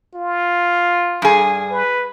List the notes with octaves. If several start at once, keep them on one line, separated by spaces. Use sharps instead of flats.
F4
G2 G#4
B4